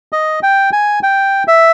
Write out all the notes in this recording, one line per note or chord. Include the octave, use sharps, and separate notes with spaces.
D#5
G5
G#5
G5
E5